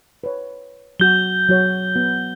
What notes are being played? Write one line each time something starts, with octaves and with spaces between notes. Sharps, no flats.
B4 C#5
F#3 F#4 G6 G7
F#3 F#4 C#5
B3 F#4